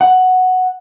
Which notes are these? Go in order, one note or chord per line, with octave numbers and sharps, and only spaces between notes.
F#5